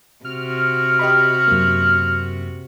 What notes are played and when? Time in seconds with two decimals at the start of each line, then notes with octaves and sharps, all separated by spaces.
0.25 C3 F#4 F6
0.99 G4 D#5 B5
1.48 F#2 A#3